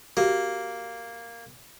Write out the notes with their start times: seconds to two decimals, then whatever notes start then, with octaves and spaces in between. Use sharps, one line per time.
0.17 A#3 F#4 G4